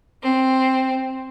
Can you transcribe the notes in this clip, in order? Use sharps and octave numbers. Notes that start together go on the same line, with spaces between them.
C4